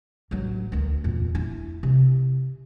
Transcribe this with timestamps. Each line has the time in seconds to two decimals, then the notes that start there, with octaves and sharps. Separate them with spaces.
0.31 A1 F#3
0.72 D2 D#3
1.04 E2 A#2
1.35 E4
1.83 C3